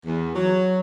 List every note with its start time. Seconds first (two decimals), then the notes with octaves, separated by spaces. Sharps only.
0.05 E2
0.35 F#3